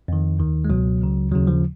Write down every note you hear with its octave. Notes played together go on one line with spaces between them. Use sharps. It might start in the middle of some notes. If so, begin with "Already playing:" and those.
F2 D#3
D#2 D#3
G#3
C#2 B2 F#3
C#2 C#3
D#2 C#3 F#3
F3